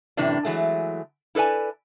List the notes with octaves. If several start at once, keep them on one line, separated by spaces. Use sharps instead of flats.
F#2 A2 C3 E3 D4
E3 F#3 G#3 A3
E4 A4 B4 D5 G#5